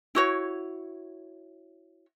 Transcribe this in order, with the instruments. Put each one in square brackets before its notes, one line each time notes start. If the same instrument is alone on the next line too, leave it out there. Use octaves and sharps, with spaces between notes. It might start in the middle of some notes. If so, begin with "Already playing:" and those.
[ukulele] E4 F#4 C#5